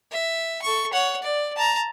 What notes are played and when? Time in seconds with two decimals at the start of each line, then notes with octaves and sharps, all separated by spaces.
0.11 E5
0.62 A4 C#6
0.93 C#5 F#5
1.22 D5
1.56 A5 A#5